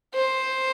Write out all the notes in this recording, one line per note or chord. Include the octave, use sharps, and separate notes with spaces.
C5